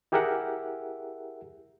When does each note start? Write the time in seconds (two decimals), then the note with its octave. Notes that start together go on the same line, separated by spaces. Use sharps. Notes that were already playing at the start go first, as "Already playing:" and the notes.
0.12 E4 G4 G#4 A#4 E5 F#5